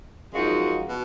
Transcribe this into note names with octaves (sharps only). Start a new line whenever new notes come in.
F#2 F3 G#3 D#4 F#4
B2